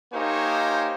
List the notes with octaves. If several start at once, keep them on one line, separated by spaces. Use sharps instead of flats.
A#3 D#4 G4 C5 C#5 G#5